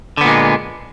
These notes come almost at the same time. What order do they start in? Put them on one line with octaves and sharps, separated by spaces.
D3 B3 A#2 G#3